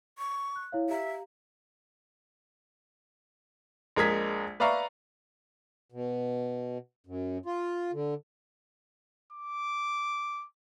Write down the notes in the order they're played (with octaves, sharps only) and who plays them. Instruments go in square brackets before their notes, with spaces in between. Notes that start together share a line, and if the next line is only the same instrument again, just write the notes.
[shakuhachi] C#6
[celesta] F#6
E4 C#5 F5
[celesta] G4 F5 A#5 [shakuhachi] E5
[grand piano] A#1 G#3 A#4 D#6 G#6 B6
B4 D5 E5 F5 A#5 C#6
[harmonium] B2
F#2
F4
D3
[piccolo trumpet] D6